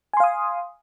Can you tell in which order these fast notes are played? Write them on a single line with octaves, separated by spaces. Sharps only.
G#5 C6 F5 D#6